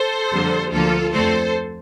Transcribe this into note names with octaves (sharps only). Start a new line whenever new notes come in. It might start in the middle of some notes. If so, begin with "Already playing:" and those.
Already playing: A4 C5
F2 D3 G3 A#3
D2 D3 F3 A#3 F4 A4
F2 D3 F3 A3 C4 A4 C5